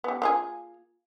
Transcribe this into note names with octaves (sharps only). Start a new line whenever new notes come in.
G3 B3
A#3 F4 G#4